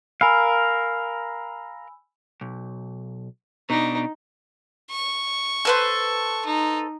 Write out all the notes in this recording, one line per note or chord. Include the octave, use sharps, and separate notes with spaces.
A#4 F5 G#5 B5 E6
B1
B2 D4 D#4
C#6
A4 B4 C5
D#4